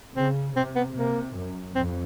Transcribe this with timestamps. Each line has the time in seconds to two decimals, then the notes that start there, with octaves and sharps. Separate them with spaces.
0.16 C#3 C4
0.56 C3 C4
0.76 B3
0.95 C3 A#3
1.35 F#2
1.75 F2 C4